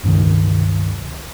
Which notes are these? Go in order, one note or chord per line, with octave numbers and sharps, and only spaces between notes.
C#2 G2 B2 D#3